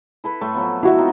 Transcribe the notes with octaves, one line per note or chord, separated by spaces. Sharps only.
E4 A4 B4
A2 A3 C6
F3 F#3 B3
E4 F#4 E5
C4 D#4 F4